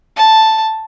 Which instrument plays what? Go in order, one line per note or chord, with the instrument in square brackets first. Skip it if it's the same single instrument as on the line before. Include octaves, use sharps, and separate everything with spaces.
[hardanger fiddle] A5